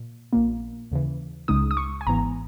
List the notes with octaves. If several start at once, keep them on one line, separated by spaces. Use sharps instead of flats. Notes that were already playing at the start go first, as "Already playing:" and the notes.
Already playing: A#2
A#1 A#2 A#3
D#2 C#3 E3
C#2 C#3 G#3 D#4 D#6
D#6
C#6
G#5
G#1 G#2 E3 B3 A#5